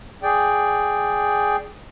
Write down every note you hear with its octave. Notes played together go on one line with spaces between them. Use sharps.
G#4 D5 G5